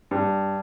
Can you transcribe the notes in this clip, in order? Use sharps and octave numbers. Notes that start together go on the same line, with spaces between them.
G2